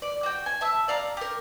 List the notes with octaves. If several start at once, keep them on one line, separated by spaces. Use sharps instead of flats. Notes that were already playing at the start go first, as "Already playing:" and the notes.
D5
F#4 G5
G#5
E5 A5 E6
D5 F5 A5 A#5
G4 A#4